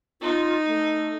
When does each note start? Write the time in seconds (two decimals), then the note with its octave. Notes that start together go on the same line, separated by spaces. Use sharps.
0.21 D#4 F4
0.67 A3